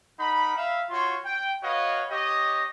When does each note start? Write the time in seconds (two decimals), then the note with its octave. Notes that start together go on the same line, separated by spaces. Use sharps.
0.18 D#4 A#4 F#5 B5
0.56 E5 F5
0.90 F4 F#4 C#5 C6
1.24 G5
1.63 F#4 B4 C#5 D#5 F5
2.11 G4 C#5 D#5